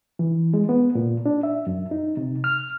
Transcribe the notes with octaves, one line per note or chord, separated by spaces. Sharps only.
E3
G#3
B3
A#2
D4
E5
F#2
D#4
C3
F6